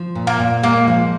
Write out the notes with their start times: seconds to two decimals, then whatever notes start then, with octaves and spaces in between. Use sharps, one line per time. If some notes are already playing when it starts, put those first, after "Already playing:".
Already playing: F3
0.15 A#2
0.27 A#3
0.40 A#2
0.63 G#3 A#3
0.87 F3